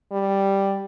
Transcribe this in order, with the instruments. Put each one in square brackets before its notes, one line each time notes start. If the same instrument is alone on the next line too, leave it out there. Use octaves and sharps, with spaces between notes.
[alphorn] G3